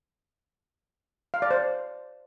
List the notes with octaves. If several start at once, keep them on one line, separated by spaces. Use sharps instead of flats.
F5
D5
C5